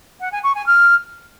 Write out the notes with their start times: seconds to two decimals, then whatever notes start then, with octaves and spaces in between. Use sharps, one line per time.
0.21 F#5
0.32 G#5
0.44 C#6
0.55 G#5
0.66 F6